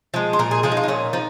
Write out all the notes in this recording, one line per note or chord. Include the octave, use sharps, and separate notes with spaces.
F3 G#3
C5
A#2 A#4
G#4
F3 G#3 G#4
D#4
F4
D#4
A#2 C#4
F3 D#4